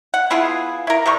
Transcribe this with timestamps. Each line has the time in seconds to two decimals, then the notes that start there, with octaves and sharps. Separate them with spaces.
0.14 F#5
0.30 B3 E4 F4 G#4
0.87 E4 A#4
1.06 C3 D#3 G3 C#6